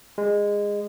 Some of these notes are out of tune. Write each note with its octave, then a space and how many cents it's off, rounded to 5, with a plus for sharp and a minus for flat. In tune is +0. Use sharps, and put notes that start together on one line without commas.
G#3 -20